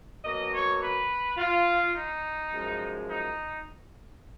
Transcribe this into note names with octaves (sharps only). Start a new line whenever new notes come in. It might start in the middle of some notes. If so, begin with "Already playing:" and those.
B2 F#3 A#3 D#5
C#5
B4
F4
D#4
F#2 F3 G#3
D#4